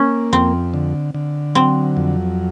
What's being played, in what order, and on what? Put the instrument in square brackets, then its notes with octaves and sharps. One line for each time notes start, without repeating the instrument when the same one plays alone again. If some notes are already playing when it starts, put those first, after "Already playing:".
Already playing: [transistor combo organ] A#3 [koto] C#4
[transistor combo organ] F2 [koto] C4
[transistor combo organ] D3
D3
[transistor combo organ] F#3 [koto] C4
[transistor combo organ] F2